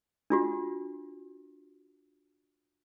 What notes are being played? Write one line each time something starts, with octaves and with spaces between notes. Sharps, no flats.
D4 F4 F#4